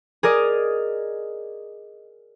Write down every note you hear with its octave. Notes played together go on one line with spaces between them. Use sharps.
G#4 A#4 D5 D#5